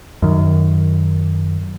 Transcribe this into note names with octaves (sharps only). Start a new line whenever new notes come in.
F#2 D#3